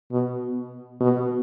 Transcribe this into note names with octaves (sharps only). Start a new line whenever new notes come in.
B2
B2